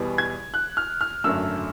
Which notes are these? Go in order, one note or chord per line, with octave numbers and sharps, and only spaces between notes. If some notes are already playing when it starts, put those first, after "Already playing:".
Already playing: E2 B2 G3 B3
G#6
F#6
F6
F6
G#1 F#2 D3 F#3 A3 E6